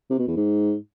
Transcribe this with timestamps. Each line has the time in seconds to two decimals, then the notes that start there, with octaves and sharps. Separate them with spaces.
0.10 C3
0.19 B2
0.28 E2
0.36 G#2